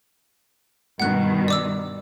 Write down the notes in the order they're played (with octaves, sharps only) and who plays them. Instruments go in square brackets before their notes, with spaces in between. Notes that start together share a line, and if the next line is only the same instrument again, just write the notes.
[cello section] G2 B2 D#3 [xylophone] F#5 F#6
[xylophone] D5 D6 E6